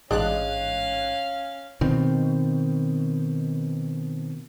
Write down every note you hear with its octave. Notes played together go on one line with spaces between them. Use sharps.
A1 G#2 G#3 C#4 D4 F5 F#6
B2 D#3 C4